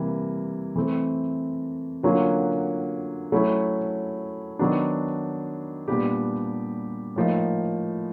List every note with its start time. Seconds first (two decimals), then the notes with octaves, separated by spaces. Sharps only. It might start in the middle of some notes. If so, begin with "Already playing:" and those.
Already playing: C3 E3 G3 A#3
0.76 E3 A3 C4
2.03 D3 F#3 A#3 C#4 F4
3.32 F#3 A3 C#4 E4
4.59 D#3 F#3 B3 D4
5.88 A#2 G3 B3 D4 G4
7.16 A2 F3 A#3 D#4